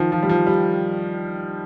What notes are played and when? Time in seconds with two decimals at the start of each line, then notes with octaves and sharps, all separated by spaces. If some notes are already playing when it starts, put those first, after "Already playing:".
Already playing: D#3 F3
0.12 F3
0.23 G3
0.29 F3
0.47 G3